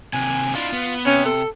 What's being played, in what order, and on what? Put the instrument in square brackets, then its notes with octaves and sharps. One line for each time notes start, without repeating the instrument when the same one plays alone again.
[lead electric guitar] D#2 C3 [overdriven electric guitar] G#5
[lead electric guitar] D4 E4 [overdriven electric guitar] F4
[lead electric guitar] B3
[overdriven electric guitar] C3 [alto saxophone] C#4
[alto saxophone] A4